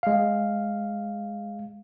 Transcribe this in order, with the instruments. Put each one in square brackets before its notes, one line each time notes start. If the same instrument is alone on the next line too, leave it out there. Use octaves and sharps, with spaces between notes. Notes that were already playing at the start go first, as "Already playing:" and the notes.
[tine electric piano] G#3 F5